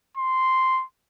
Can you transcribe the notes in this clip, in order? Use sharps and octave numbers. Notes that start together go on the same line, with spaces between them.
C6